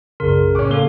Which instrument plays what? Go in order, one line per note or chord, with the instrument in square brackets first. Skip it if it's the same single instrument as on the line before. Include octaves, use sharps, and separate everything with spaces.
[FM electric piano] B1 F#2 C6 [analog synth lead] C#3 [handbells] A#4
[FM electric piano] A2 C#6 F#6 [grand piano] C#4 D6
[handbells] A#3 A4 [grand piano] F5 G7